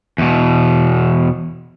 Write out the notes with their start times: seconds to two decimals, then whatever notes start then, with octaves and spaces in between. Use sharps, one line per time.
0.18 E2 B2